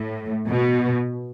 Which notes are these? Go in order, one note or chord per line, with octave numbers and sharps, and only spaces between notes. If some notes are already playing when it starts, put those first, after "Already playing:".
Already playing: A2
B2